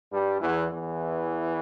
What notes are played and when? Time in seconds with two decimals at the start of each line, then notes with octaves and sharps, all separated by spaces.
0.12 G2 G3
0.41 E2 E3
0.70 E2 E3